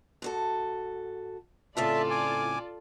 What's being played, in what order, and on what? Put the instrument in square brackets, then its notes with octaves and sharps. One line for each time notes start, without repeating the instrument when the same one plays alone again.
[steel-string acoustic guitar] G#2 F#4 A4
[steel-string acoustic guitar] A2 C#3 C4 [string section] F4 A4 D5 [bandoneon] E5 A5
[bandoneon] G#5 D6